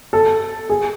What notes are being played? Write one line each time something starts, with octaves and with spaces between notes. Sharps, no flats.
A4
G#4